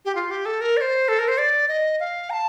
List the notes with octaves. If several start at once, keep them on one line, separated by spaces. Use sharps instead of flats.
G4
F4
G4
A4
A#4
D5
C5
A4
A#4
C5
D5
D#5
F5
A#5
A5